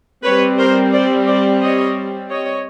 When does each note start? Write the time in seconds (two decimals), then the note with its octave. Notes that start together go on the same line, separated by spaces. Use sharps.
0.24 G3 C4 B4 C#5
0.58 A#4 C5
0.92 C5 D5
1.27 C5 D5
1.61 C#5 D#5
2.30 C#5 D#5